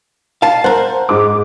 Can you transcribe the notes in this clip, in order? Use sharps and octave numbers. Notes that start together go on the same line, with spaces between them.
F5 A5
A#4 C5 F#5
G#2 D6